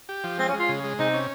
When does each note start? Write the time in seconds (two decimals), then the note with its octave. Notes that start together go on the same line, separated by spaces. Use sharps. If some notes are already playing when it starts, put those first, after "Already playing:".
0.09 G4
0.24 F3
0.38 G#3 C4
0.48 C#4
0.53 G#3
0.59 F4
0.69 C#3
0.84 G#3
0.99 C3 D#4
1.14 C#4